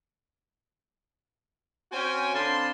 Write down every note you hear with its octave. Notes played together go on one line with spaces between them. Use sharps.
C4 C#4 F#4 C5 G5 G#5
D3 C4 F5 A5 B5 C6